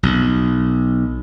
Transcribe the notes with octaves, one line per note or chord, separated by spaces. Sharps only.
B1